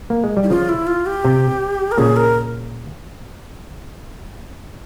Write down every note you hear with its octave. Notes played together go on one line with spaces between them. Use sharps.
A#3
G#3
G3
E4
C#3 F3 F4
E4
F4
G4
C3
A#4
A#2 C#3 G#4
A#4